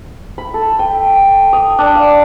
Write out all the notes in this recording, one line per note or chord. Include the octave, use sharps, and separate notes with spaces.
B5
A4
G5
D#6
D4
F5